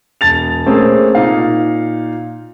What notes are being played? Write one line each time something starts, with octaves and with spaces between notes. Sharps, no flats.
E1 A5 A6 F7
A3 A#3 C4 C#4 G#4
A#2 D#4 F5